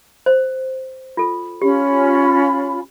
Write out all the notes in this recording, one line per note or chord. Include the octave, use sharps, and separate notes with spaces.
C5
F4 A4
C#4 F4 G4 B5